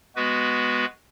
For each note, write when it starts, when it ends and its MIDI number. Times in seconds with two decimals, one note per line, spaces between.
0.16 0.85 56
0.16 0.85 59
0.16 0.85 66
0.16 0.85 71